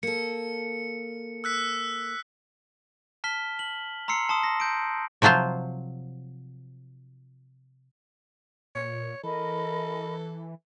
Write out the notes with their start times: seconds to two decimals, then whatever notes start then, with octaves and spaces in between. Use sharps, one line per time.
0.03 A#3 A4 C#7
1.44 E6 F#6 B6
3.24 A5 F6 B6 G7
3.59 F#7
4.08 A#5 C6 E6 C7 C#7
4.29 A5 C6 D#6
4.43 A#6
4.60 G6 D7
5.22 C3 F3 F#3 F4 C5
8.75 A#2 C#5
9.24 E3 A4 A#4 D#5 B5